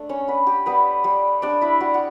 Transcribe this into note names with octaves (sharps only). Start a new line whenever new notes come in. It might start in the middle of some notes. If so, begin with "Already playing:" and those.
Already playing: A3 D4
C#4 C#5
B3 D4 B4
G4
G3 B3 B4
G3
G3 D4 D5
E4 E5
G3 F#4
F#4